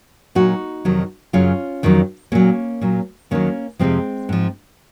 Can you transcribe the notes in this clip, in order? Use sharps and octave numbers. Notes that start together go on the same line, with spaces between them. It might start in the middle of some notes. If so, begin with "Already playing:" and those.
A#2 F#3 D#4 F#4
F2 C3 D#3 F#3
F#2 C#3 F#3 C#4 F4
F2 D#3 F#3
A#2 F#3 A#3 C#4
A#2 F#3
D#2 D#3 F#3 A#3 C#4
F2 C3 F3 G#3 C4
G#2 F3